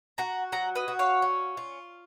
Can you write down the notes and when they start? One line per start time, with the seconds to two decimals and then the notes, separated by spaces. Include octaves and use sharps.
0.18 F#4 F#5 A#5
0.52 F#3 F#5 A#5
0.75 B4 D#5
0.88 F#4
0.99 C#5 F5
1.22 C#4
1.57 F4